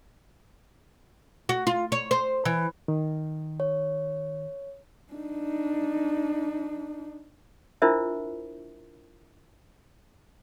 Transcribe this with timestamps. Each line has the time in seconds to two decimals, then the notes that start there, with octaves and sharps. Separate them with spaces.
1.49 F#4
1.67 F4
1.92 C#5
2.11 C5
2.45 E3
2.88 D#3
3.60 C#5
5.13 D4 D#4
7.82 D4 E4 F4 A#4 C5 E5